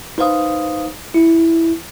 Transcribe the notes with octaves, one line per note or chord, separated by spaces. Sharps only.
D#4 B4 C5 F5 D#6
E4